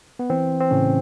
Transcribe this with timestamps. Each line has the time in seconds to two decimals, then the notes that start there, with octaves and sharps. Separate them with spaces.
0.19 B3
0.30 E3 C4
0.60 C4
0.71 A2 C#3 C#4